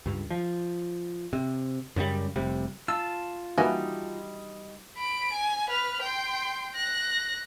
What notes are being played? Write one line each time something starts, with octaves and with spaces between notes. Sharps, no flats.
C#2 G2
F3
C3
F#2 C#3 F3 G3
F1 C3 G3
F4 A5 E6
G3 A#3 D#4 F#4 B4 E5 G#5
B5 D7
G#5
B4 F6
G5 C6
F#6 A#6